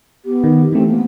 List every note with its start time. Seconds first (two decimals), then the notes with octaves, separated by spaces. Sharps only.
0.25 B3 G4
0.44 D#3
0.72 E3 A3 C4
0.88 A#3 B3